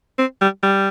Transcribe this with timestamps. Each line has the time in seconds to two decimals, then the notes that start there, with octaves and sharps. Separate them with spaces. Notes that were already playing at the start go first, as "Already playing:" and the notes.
0.19 C4
0.41 G3
0.63 G3